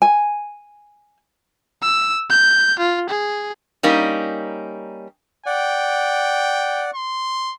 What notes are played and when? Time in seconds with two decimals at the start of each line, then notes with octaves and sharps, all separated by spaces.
0.02 G#5
1.83 E6
2.30 G6
2.79 F4
3.10 G#4
3.83 G3 A#3 C#4 D#4
5.46 D5 F#5 G5
6.95 C6